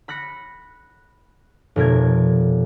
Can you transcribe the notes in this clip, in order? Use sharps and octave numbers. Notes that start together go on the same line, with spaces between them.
B5 F#6 A#6 C#7
F1 B2 A#4 G#6